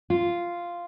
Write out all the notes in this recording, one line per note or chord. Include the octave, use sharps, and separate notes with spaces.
F4